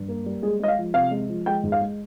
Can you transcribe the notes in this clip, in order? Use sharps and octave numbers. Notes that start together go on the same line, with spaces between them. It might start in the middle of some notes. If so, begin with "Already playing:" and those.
Already playing: G2
A#3
G3
G#3 G#4
G#3 D#5
F5
F3
C3 F5
G#3
F3
G#3 G5
G#2
F5
G#3